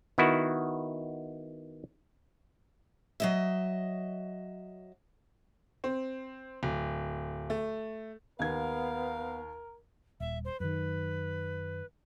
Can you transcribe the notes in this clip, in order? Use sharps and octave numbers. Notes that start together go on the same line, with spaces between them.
D#3 B3 E4 F#4
F#3 D#5 E5
C4
D1
A3
D#2 B3 A#4 F5 G#6
D#1 E5
C5
F#2 D#3 B4